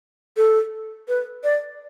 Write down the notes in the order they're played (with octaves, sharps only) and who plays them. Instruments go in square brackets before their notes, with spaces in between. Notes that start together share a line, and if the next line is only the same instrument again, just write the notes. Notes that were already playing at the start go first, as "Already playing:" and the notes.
[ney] A4
B4
D5